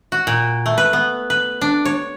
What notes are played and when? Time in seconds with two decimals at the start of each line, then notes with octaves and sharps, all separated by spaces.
0.12 F#4
0.27 A#2
0.66 A3
0.78 B4
0.93 B3
1.30 B4
1.61 D4
1.85 C#5